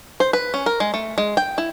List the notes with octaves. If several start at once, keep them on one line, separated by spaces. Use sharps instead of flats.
C5
B4
C#4
A#4
G#3
A3
G#3
G5
E4